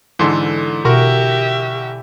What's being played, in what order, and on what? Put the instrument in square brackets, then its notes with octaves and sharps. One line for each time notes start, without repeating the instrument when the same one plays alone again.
[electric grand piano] G#2 A4 C6 [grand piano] D3 E3
[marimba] B2 [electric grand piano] F#4 A#4 C#6 [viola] G4 E5